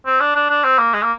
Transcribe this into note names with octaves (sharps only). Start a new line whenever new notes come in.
C4
D4
D4
D4
C4
A#3
G#3
A#3